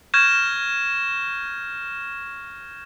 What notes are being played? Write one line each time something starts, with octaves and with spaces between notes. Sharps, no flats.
C#6 F6 G6 G#6 A#6 E7